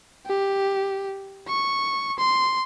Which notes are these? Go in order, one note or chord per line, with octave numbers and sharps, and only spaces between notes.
G4
C#6
C6